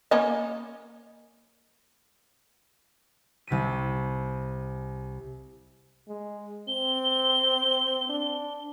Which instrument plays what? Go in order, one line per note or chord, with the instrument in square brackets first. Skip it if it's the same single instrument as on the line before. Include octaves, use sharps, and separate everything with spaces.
[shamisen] A#3 C#4 D#5
[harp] C2 C3 B6 D#7
[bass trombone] G#3
[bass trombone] C4 [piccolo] G7
[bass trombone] D4